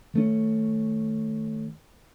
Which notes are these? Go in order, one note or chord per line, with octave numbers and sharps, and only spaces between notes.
D#3 A3 C#4